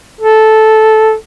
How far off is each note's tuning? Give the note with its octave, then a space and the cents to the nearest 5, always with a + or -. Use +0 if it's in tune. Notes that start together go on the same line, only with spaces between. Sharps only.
A4 -10